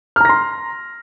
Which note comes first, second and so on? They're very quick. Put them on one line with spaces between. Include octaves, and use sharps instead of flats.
F6 A#5 A#6 C6